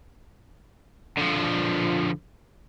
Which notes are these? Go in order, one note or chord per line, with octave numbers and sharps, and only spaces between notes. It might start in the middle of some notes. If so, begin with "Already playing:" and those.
D3 F3